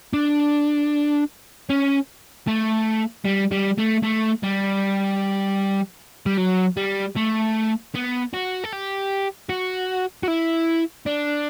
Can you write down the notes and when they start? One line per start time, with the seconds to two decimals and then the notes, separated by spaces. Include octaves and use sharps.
0.13 D4
1.69 C#4
2.47 A3
3.25 G3
3.51 G3
3.78 A3
4.03 A3
4.43 G3
6.26 G3
6.38 F#3
6.77 G3
7.16 A3
7.94 B3
8.33 F#4
8.64 A4
8.72 G4
9.49 F#4
10.23 F#4
10.28 E4
11.06 D4